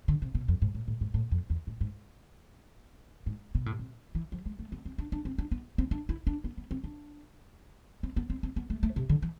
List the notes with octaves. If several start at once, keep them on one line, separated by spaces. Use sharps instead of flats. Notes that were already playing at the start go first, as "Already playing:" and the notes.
D3
C3
B2
F2
G#2
A2
A2
G#2
A2
F2
E2
A2
G#2
G#2
B2
A2
C3
E3
F3
G#3
A3
B3
C4
D4
D4
C4
D4
B3
C4
D4
E4
D4
B3
B3
C4
D4
C4
B3
C4
C4
B3
A3
A3
C3
D3
E3